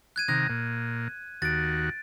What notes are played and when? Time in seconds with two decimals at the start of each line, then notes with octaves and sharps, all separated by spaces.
0.16 F#6 G#6 D#7
0.28 C3 D#3 A#5 F#6
0.50 A#2
1.42 D#2 F#4 A6 D7